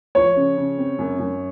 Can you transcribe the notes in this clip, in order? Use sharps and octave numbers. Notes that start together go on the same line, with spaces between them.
F3 C#5
C#3
C#3
C4
F#2
F#2